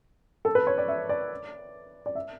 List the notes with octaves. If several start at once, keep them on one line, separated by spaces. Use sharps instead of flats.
A4
B4
C#5
D5
E5
D5
D5
E5